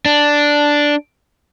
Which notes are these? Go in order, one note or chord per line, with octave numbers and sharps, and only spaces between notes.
D4